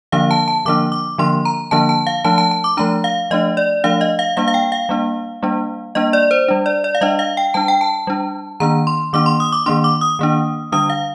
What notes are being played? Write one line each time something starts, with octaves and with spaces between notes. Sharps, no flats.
D3 F3 A#3 D4 F5
A5
A5
D3 F3 A#3 D4 D6
D6
D3 F3 A#3 D4 C6
A#5
D3 F3 A#3 D4 A5
A5
F5
F3 A3 D4 A5
A5
A5
D6
F3 A3 D4 A#5
F5
F3 A3 D4 D#5
D5
F3 A3 D4 F5
D#5
F5
G3 A#3 D4 F5
F5
G5
F5
G3 A#3 D4
G3 A#3 D4
G3 A#3 D4 D#5
D5
C5
G3 D4
D5
D5
F5
G3 D4 D#5
F5
G5
G3 D4 A5
G5
A5
G3 D4
D#3 A#3 D4 A#5
C6
D#3 A#3 D4 D6
C6
D#6
D6
D#3 A#3 D4 C6
D6
D#6
D#3 A#3 D4
D3 G3 D4 D#6
F5